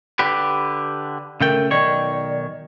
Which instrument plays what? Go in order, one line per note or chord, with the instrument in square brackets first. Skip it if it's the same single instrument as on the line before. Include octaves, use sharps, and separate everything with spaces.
[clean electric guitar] D3 G4 B4
[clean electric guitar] C#3 A3 G5 [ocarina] A#4
[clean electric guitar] B1 D#3 C#5 [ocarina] D5